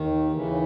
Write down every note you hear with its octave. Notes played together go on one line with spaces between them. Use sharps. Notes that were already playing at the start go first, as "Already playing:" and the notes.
Already playing: D#2 D#3
D#2 C#3 E3